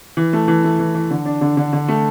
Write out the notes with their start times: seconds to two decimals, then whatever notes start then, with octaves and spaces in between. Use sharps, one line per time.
0.17 E3
0.33 A3
0.48 E3
0.64 A3
0.79 E3
0.95 E3
1.11 D3
1.25 D4
1.41 D3
1.57 D3
1.73 D3
1.89 A3